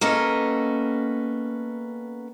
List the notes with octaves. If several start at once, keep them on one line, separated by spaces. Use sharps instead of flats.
A#3 B3 C#4 A4 D#5